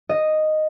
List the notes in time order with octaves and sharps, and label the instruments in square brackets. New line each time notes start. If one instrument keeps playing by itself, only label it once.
[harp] D#5